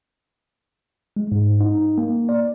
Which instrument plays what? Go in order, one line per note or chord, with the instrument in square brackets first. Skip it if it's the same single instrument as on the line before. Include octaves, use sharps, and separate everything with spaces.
[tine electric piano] G#3
G#2
D#4
A#3
D5